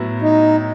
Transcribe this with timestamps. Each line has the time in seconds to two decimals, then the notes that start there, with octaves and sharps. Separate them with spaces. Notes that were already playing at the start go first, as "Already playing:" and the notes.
Already playing: A2 F#3 B3 E4
0.22 D#4